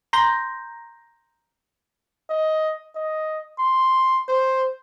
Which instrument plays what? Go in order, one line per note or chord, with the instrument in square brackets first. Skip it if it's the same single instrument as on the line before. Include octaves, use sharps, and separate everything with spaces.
[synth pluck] A#5 C6 G6 A#6
[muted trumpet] D#5
D#5
C6
C5